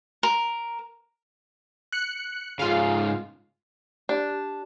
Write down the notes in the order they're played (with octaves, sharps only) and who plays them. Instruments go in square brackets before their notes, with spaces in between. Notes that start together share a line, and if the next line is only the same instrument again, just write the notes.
[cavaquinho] A#4
[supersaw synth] F#6 C#7
[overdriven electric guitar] G#2 C#3 [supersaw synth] F4 F5
[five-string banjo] D4 [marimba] G4
[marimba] G4